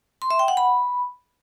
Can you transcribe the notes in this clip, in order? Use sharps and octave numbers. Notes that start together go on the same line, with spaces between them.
C6
E5
G5
F#5
B5